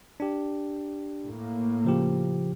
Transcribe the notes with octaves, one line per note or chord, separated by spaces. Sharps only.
D4 G4
A2 A#3
C#3 F3 G4